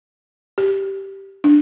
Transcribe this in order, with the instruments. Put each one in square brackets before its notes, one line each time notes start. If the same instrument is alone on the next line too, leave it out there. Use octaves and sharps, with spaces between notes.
[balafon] G4
D4